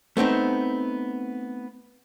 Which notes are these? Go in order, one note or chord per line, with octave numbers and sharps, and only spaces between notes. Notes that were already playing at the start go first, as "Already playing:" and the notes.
A3 B3 C4 D#4